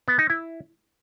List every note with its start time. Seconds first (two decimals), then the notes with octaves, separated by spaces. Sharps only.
0.08 B3
0.19 D#4
0.30 E4